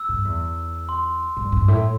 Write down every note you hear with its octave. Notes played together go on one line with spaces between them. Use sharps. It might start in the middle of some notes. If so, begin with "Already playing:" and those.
Already playing: E6
G2
E2
C6
G2
G2
A2